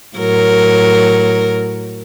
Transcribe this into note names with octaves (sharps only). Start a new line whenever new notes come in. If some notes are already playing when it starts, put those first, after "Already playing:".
A2 F#3 A#4